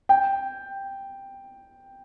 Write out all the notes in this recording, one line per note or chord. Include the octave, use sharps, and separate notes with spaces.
G5